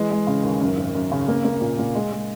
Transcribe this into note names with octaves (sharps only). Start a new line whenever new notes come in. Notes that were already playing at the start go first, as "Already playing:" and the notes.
Already playing: E3 G#3
G#3
C#3
D#2
F#2
G#1
F#2
C#3
A#3
A#3
A#2
A#2
G#3
G#3